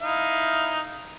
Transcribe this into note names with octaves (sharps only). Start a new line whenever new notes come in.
D#4 E4 F5